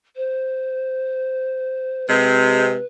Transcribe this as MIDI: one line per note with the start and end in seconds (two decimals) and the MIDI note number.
0.16 2.06 72
2.09 2.76 48
2.09 2.76 56
2.09 2.84 71